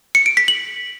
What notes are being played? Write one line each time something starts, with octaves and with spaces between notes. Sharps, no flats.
C#7
D7
B6
F#7